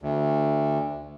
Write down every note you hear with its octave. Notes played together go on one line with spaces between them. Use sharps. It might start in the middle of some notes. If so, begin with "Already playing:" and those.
D2